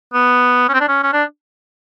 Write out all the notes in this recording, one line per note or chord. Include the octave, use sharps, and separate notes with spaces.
B3
C#4
C4
D4
C#4
C#4
D4